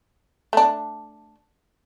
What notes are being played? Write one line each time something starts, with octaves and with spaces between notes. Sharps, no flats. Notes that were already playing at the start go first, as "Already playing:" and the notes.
A3 D4